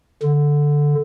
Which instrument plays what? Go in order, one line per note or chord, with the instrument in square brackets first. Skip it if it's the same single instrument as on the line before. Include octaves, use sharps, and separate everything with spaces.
[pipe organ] D3